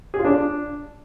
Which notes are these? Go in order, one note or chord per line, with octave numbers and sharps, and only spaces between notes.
G#4
F4
D4